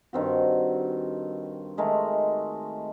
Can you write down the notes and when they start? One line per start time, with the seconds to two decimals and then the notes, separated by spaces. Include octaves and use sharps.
0.13 G2 D#3 C4 F#4
1.78 D#3 G#3 A3 A#4